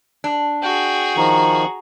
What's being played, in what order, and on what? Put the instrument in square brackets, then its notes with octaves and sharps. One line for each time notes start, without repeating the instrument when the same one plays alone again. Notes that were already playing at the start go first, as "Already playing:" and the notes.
[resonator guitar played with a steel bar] D4
[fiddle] F#4 G#4 [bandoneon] G5
[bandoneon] D#3 F3 [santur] A#5